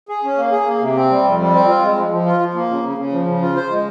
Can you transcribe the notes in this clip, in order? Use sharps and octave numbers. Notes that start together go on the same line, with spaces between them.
G#4
C#4
A#3
G#4
A#3
C3
C4
G3
F2
G3
C4
F4
G#3
F3
F3
F4
F3
A#3
C#3
C#3
C#3
F3
C#3
F4
C5
G#3